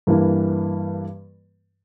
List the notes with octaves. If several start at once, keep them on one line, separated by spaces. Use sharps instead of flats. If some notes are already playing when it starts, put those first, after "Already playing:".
G2 E3 A#3